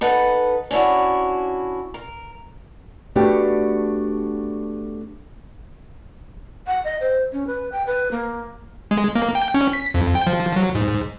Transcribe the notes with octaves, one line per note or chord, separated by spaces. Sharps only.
D#4 A4 B4 F#5
C#4 D4 E4 F#4
A#4
A3 B3 D4 F#4 G4
F#5
D#5
C5
C#4
B4
G5
B4
A#3
G#3
A#3
G5
C#4
B6
F2
G5
F3
F#3
G#2